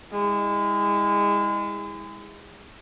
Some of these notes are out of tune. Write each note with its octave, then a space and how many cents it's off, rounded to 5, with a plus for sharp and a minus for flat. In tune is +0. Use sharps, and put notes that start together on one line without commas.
G#3 -35 E4 -35